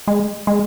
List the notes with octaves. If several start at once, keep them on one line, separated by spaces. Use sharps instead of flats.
G#3
G#3